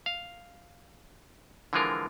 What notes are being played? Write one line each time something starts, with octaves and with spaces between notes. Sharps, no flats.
F5
D3 E3 F3 G#3 F4 A#4